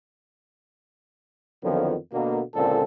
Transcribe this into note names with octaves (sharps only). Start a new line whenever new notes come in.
F2 D3 D#3 F3 F#3 B3
B2 D3 A#3
C#2 A#2 D3 C4 A4